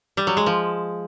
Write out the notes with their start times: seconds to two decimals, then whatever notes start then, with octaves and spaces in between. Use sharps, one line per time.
0.17 G3
0.27 F#3
0.37 G#3
0.46 F3